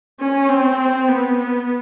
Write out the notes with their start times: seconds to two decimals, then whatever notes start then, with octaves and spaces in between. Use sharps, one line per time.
0.20 C#4
0.49 C4
1.08 B3